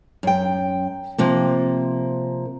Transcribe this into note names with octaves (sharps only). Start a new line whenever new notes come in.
F#2 G5
C3 F3 A#3